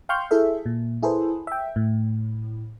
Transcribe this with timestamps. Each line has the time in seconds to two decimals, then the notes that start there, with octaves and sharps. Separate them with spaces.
0.09 F5 G5 C6 C#6 F6 G6
0.31 E4 G#4 A4 E5
0.66 A#2
1.03 E4 G#4 A4 B4 C5
1.47 E5 G5
1.76 A2